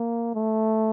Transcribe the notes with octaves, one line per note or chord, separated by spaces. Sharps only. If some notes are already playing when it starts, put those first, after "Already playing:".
Already playing: A#3
A3